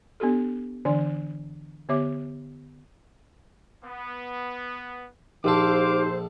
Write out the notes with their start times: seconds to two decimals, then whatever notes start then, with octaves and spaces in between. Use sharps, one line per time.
0.20 B3 D4 G4 A4
0.85 D3 E3 D4 D5 G#5
1.89 D3 B3 G4 C#5 E5 D6
3.84 B3
5.44 A#1 D#4 G4 A4 C5 F5 D6